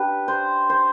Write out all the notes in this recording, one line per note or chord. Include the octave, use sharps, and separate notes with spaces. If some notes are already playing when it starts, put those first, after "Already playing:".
Already playing: D4 G4 B4
C5
C5